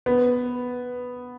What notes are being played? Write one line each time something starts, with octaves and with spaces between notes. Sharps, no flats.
B3